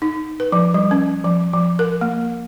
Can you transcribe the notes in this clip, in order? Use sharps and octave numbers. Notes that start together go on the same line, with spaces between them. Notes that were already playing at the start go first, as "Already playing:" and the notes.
D#4
B4
F3
G3
C#4
F3
F3
A#4
A#3